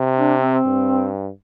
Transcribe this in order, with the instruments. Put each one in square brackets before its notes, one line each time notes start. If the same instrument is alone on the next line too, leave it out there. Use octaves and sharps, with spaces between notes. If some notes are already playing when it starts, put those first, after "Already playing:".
Already playing: [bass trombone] C3
[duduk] D4
C4
[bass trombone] G2